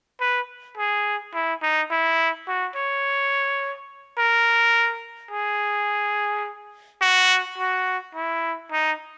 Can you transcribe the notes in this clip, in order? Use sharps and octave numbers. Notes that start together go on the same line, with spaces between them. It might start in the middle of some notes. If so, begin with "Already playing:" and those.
B4
G#4
E4
D#4
E4
F#4
C#5
A#4
G#4
F#4
F#4
E4
D#4